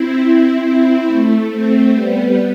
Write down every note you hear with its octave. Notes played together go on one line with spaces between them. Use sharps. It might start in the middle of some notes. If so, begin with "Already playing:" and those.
Already playing: C4 E4
C4 E4
A3
A3 C4
G3 B3